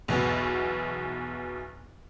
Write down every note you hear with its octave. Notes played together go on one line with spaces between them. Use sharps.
B1 E2 B2 B3